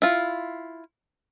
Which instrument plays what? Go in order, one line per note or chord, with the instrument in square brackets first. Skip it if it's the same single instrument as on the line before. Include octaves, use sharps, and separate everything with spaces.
[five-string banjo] E4 F4